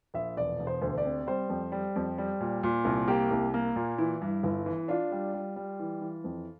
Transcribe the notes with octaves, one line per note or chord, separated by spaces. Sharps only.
A#1 E5
E1 D5
E1
C5
D2
D5
C3
G3 C5
F2
G3
F2
G3
A#2
A#2
C2
A#3 G4
C2
A#3
A#2
E3 E4
G2
G1 E4
E3
D4 F4
G3
G3
G3
E3
E3
F2